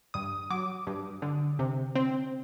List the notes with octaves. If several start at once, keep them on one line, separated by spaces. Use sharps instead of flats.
G2 D#6
F#3 D6
G2
D3
C3
C4